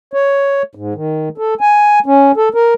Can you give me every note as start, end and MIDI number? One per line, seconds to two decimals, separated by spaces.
0.13 0.63 73
0.75 0.94 44
0.95 1.29 51
1.38 1.54 69
1.61 1.99 80
2.06 2.32 61
2.37 2.49 69
2.54 2.74 70